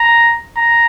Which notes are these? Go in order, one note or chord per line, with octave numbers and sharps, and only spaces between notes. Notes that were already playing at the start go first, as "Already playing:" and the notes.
Already playing: A#5
A#5